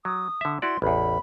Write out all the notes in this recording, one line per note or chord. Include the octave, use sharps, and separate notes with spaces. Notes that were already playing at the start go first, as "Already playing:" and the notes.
F#3 D#6
D3 E5
E4 F#4 D5 C6
A1 E2 B5